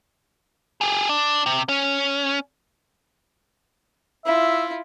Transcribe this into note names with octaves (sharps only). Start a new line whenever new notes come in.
G4 G#4
D4
C3
C#4
E4 F4 E5